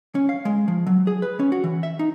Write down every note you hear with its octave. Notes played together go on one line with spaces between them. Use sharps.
C#4
F5
G#3
F3
F#3
G#4
B4
C#4
F#4
E3
E5
D#4